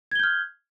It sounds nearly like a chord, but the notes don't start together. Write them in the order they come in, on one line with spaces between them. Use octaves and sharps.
G#6 G7 G6 F6